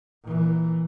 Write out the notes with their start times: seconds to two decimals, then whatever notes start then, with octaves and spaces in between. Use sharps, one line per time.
0.24 A#2 E3